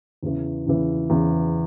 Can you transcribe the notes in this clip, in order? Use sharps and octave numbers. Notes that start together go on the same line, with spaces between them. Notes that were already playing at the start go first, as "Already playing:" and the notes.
E2 C#3 E3
E2 C#3 E3
E2 C#3 E3